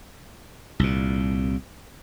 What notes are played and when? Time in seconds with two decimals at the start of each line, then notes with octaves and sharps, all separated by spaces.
0.79 C2 A#2